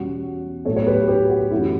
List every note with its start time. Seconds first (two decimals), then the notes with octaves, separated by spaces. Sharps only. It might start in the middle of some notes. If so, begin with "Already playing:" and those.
Already playing: E2 B2 G3 C#4 F#4
0.65 A2 F#3 B3 A4 C#5
0.76 C#5
0.87 G4 B4
1.08 G4 B4
1.29 F#4
1.51 F#2 E3 A3 C#4 E4 G4